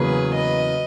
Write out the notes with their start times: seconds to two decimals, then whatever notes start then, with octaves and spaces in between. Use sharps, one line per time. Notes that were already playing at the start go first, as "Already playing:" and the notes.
Already playing: E2 C#3 F#3 A#3 G#4 B4
0.34 B4 D#5